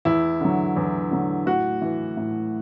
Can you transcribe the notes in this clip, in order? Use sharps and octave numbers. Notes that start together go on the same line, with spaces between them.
E2 E4
D3 F#3
E2
D3 F#3
A2 F#4
E3
A2